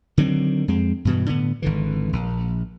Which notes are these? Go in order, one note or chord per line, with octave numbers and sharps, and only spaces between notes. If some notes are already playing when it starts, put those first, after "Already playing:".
D3 D#3 F#3 C4
F2 G#3 C4
G2 B2 E3
A2 D3 B3
G#1 D3 E3
A#1